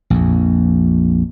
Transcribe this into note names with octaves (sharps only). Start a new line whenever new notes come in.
A#1 F2